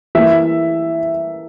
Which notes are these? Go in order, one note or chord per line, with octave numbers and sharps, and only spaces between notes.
E3 A#3 E5